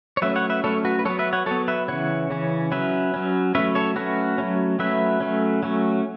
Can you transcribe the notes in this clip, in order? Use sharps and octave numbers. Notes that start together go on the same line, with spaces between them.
C#5
F#3 A3 C#4 B4 E5
C#5 F#5
B4 E5
F#3 A3 C#4 A4 C#5
F#4 B4
B4
F#3 B3 A4 C#5
B4 E5
C#5 F#5
F#3 B3 A4 C#5
B4 E5
C#3 E3 C#4 C#5 F#5
C#3 E3 C#4
F#3 C#4 B4 E5
F#3 C#4
F#3 A3 C#4 B4 E5
A4 C#5
F#3 A3 C#4 F#4 B4
F#3 A3 C#4
F#3 A3 C#4 B4 E5
F#3 A3 C#4
F#3 A3 C#4